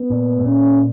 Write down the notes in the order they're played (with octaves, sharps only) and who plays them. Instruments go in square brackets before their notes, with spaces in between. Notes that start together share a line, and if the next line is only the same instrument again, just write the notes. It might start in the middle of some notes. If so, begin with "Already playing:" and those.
Already playing: [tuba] B3
[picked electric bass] A#2
A2
[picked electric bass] A#2 [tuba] C#4